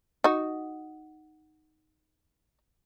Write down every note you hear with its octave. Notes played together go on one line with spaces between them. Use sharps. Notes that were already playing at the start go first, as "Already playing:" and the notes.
D#4 F#4